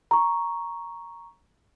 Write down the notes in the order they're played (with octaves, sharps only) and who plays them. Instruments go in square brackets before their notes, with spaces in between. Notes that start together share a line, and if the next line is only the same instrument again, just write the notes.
[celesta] A#5 C#6